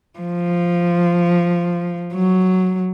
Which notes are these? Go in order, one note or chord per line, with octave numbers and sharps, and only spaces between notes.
F3
F#3